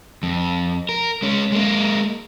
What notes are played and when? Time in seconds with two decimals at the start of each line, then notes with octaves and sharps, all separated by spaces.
0.23 F2
0.89 A#4
1.22 G#3 C#4
1.52 G#3 A#3